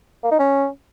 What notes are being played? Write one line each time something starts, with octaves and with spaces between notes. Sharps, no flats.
A#3
D#4
C#4